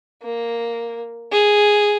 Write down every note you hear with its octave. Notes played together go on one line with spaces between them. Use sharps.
A#3
G#4